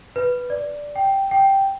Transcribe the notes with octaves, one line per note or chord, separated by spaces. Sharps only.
B4
D5
G5
G5